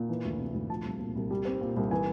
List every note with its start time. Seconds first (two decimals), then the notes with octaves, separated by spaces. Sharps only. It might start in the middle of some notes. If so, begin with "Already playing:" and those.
Already playing: A#2
0.09 E3
0.25 D2
0.39 C3
0.54 D2
0.70 F3 A5
0.85 C2
1.00 A#2
1.15 C2
1.31 G3
1.45 C4
1.61 A#2
1.76 C2
1.91 E3 G#5